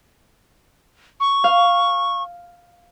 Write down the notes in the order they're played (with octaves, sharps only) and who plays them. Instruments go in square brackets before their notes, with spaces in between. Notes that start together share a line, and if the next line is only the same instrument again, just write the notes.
[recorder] C#6
[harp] F5